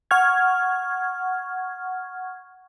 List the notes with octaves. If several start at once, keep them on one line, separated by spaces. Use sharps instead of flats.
F#5 C#6 F6 G#6